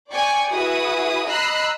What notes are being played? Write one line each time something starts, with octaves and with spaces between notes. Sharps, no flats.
D5 G5 G#5 C#6
E4 F#4 G#4 B4 E5 D#6
D#5 A#5 B5 E6 F#6 C7